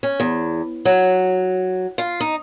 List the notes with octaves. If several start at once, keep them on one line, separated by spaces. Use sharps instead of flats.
C#4
E2
F#3
F4
D#4